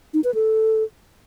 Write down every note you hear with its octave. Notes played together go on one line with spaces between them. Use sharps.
D#4
B4
A4